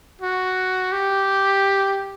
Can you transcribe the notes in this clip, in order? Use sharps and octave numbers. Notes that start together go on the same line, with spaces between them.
F#4
G4